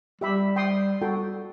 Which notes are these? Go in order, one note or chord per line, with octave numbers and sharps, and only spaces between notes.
G3 G4 E5 B5
G5 C6 D#6
F#4 A4 G5